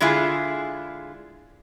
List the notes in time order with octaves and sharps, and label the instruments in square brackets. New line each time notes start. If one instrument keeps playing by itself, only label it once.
[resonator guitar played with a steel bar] D3 G#3 E4 F4 G#4